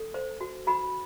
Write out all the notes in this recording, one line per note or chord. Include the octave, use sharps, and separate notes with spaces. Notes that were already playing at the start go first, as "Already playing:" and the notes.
Already playing: A4
C5
F#4
F#4 B5